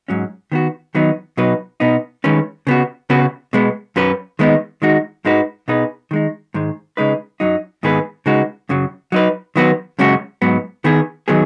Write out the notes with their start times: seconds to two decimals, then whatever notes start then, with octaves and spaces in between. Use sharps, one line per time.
0.08 G#2 F#3 C#4
0.52 D#3 B3 F#4
0.95 D#3 F#3 B3 D#4
1.37 B2 F#3 D#4 B4
1.80 B2 B3 D#4
2.24 D#3 G#3 C#4 B4
2.67 C#3 B3 F#4
3.10 C#3 B3 F#4 B4
3.53 B2 G#3 B3
3.96 F#2 F#3 C#4 B4
4.39 D#3 G#3 B3 D#4
4.82 D#3 G#3 D#4 F#4
5.25 G#2 G#3 D#4 F#4 B4
5.68 B2 B3 D#4 G#4 B4
6.11 D#3 G#3 D#4
6.54 G#2 D#3 G#3
6.97 C#3 G#3 D#4 B4
7.40 F#2 F#3 D#4
7.83 G#2 D#3 B3 G#4 B4
8.26 C#3 G#3 D#4 F#4 B4
8.69 F#2 C#3 F#3
9.12 F#3 D#4 B4
9.56 D#3 F#3 B3 F#4 B4
9.99 F#2 C#3 G#3 C#4 F#4
10.42 G#2 F#3 B3
10.84 D#3 B3 G#4
11.28 D#3 F#3 B3 G#4